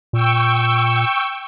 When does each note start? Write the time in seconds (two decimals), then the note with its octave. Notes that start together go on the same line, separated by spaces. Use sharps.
0.13 A#2 G5 C#6 E6